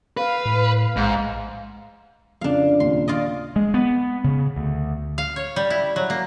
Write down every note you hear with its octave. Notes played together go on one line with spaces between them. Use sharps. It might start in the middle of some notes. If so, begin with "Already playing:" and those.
B4 F5
A2
A#1 G#2
F2 C#3 D4 F5
D#2 A#2 C#3 C6
F4 D5 D#5
G#3
B3
C#3
D2
F5
C#5
G3
E4
F#3
A#3